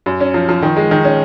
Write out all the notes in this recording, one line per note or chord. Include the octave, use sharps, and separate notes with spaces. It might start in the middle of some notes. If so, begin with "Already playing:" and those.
F#2
C#4
F3
F3
D#3
G#3
D#3
C#4